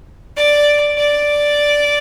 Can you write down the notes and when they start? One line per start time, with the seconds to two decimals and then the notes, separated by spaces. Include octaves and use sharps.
0.36 D5
0.97 D5